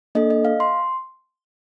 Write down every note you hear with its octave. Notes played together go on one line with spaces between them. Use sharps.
A#3 D4 A4 D#5
D#5
F5
C6